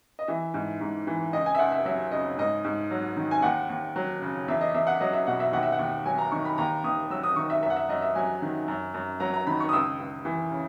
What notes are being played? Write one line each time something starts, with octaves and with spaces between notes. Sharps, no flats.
D#5
E3 E5
G#2
G#2
E3
C#2 D#5
G#5
E5
C#2 F#5
E5
F#3 E5
C#3 D#5
G#2 D#5
G#2
F#3
D#3
G#5
D#2 F#5
D#2
F#3
C#3
E2 E5
D#5
E2 E5
F#5
F#3 D#5
E5
B2 F#5
E5
D#2 F#5
E5
F#5
D#2
F#3 G#5
A#5
D#3 C#6
B5
D#2 A#5
D#2 D#6
F#3 E6
D#6
D#3 C#6
E5
F#2 E5
F#5
E5
F#2 D#5
E5
F#3 G#5
D#3
F#2
F#2
F#3 A#5
A#5
D#3 B5
C#6
D#6
C#2 E6
C#2
E3
C#3